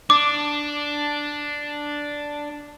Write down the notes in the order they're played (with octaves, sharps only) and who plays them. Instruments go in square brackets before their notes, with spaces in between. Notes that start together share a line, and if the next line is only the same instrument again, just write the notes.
[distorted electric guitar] D4 [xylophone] D6